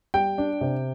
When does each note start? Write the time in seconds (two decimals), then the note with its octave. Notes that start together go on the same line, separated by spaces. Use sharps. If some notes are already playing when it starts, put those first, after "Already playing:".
0.14 G3 G5
0.38 D4
0.61 C3